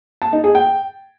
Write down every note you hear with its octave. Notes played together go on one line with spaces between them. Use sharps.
A5
D#4
G#4
G5